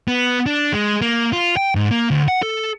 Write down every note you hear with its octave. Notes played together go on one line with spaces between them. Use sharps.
B3
D4
G#3
A#3
F4
G5
G#2
A#3
D2
F#5
A4